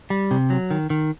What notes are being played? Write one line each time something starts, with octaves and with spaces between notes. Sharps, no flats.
G3
C3
F#3
D#3
D#3